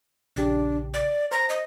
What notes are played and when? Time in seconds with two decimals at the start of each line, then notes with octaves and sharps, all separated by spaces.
0.36 A#1 C#3 D4 G4
0.94 D5
1.31 C5 A#5
1.49 D#5